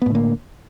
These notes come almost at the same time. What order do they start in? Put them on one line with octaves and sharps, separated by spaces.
B3 A2 D3 A#3